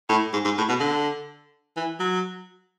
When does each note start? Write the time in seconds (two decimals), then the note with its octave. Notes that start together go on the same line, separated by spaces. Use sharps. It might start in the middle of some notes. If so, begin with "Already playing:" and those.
0.09 A2
0.33 G#2
0.45 G#2
0.58 A2
0.69 B2
0.80 D3
1.77 E3
1.99 F#3